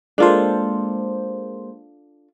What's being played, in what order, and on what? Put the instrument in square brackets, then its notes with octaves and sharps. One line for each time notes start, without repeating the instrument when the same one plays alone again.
[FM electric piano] G#3 A#3 C5 [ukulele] D4 F4 A4